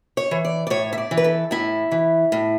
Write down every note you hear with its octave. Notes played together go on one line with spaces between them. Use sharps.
C#5
E3
D5
D5
A2 C#5
E5
D5
E3
B4
A4
A2 E4
E3
A2